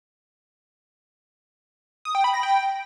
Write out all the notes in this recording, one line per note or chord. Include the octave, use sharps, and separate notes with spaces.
D#6
G5
B5
A#6
G5